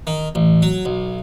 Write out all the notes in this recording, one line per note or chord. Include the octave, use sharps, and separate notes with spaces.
D#3
A1
F#3
B1